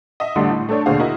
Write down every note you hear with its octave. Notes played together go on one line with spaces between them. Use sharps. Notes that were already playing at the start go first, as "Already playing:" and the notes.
D#5 E5
A1 D3 G3 A3 C6
A2
A3 D4 A4 C#5 D5
D#2 B2 D3 G#4 C5 F5
E4 F#4 A#4 D#5 E5